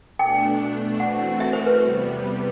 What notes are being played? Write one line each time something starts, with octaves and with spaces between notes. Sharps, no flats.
B2 A3 D4 G5
E3 A3 C4 F#4 F#5
E5
C5
B4
E2 C3 G3 B3